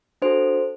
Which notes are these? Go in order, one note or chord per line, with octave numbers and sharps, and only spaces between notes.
D4 F#4 A4 C5